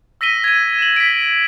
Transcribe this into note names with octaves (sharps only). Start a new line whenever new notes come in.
E6 A#6 B6 D#7 G7
G#6 D#7
E7 F#7
B6 D7